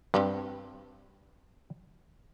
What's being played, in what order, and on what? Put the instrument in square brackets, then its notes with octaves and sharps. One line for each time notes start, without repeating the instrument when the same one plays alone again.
[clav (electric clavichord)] G2 [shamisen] C4 G4 B4